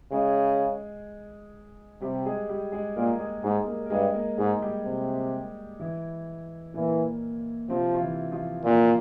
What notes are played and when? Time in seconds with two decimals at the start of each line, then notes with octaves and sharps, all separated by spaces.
0.12 C#3 G#3 G#4
2.01 C3 G3 G4
2.26 G#3 G#4
2.49 G3 G4
2.72 G#3 G#4
2.96 A#2 A#3 A#4
3.19 G#3 G#4
3.43 G#2 G#3 G#4
3.66 A#3 A#4
3.86 A#4
3.90 G2 G#3 G#4
4.14 A#3 A#4
4.38 G#2 G#3 G#4
4.62 G3 G4
4.85 C3
5.79 E3 E4
6.74 A#2 E3 A#3
7.69 C3 F3 C4
7.95 F4
8.01 E3 E4
8.32 F3 F4
8.64 A#2 F3 F4